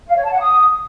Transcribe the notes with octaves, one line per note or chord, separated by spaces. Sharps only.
F5
C#5
A5
F#5
D#6